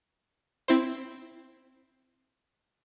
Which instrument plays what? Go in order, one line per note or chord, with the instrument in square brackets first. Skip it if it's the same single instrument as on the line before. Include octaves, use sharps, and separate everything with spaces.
[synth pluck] C4 E4 C5